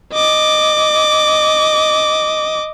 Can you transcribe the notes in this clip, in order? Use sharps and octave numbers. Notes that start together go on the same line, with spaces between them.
D#5 D6